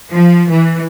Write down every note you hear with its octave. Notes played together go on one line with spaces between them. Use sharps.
F3
E3